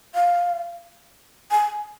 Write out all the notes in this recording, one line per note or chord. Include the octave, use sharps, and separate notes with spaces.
F5
G#5